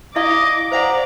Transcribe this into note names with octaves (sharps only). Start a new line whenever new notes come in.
E4 D5 D#5 F5 D6
C5 D5 F5 F#5 A#5